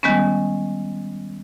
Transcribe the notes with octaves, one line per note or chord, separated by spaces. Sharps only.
D#3 G3 G#3 B3 C#4